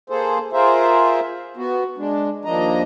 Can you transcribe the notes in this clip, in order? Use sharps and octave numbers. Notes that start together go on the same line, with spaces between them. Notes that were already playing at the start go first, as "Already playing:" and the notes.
A#3 G#4 A4 C5
F4 G#4 A#4 C5 E5
B3 F#4
G#3 D4
D#2 F3 A#3 D4 D#5 A#5